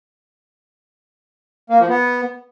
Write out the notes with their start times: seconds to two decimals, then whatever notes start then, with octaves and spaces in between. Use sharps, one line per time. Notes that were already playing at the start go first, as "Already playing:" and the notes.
1.70 A#3
1.79 F3
1.89 B3